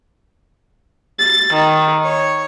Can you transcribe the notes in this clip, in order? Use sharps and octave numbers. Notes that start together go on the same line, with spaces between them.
A6
D#3
C#5